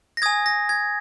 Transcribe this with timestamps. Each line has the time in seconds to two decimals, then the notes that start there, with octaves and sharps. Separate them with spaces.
0.17 A#6
0.22 G#5 D#6 G#6
0.46 A#6
0.69 G#6